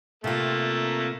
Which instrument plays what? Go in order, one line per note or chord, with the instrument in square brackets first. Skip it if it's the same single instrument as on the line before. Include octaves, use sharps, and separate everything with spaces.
[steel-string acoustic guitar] C3 F4 [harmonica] A3 A#3